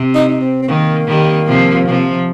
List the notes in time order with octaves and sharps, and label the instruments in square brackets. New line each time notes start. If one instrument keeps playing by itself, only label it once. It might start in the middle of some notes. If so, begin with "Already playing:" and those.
Already playing: [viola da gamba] C3
[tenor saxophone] D#4
D#4
C4
C4
[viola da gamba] D#3 [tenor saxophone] A#3
[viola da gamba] D#3 G3
C3 F3
C3 F3